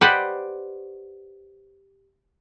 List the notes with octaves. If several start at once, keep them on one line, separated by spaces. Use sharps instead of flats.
G4 B4 C5 D5 D#5 F#5